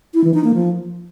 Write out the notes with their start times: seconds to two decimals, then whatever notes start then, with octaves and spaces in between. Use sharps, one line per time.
0.14 E4
0.24 E3
0.34 D#4
0.44 A#3
0.54 F3